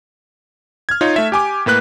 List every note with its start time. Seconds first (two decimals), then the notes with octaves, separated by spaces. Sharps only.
0.89 F6 G#6
1.01 D#4 F4 C#5
1.16 A3 E5
1.32 G4 G#5 D6
1.66 A2 A#3 B4 F#6